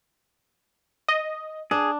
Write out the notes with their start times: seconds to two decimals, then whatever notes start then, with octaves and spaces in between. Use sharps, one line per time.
1.08 D#5
1.71 D4 G#4